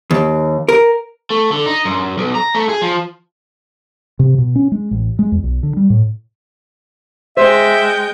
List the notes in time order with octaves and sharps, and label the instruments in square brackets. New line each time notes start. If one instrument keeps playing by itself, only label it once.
[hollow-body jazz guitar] D#2
A#4
[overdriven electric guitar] A3
D3
D#4
F#2
B1
A#5
A3
G#4
F3
[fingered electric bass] C3
B2
C#4
G#3
A1
G#3
E2
B1
D3
G3
A2
[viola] G#3 G5 [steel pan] C5 [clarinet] E5